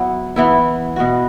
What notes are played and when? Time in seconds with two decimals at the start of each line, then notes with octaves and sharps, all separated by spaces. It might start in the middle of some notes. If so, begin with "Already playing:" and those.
Already playing: F#3 B3 E4
0.36 E3 B3 E4
0.96 B2 B3 F#4